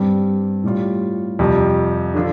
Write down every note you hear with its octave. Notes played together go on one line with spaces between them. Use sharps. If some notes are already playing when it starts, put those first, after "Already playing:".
Already playing: G2 G3 C4
A2 G3 F4
F2 C3 G3 F4
D3 F3 D4 F4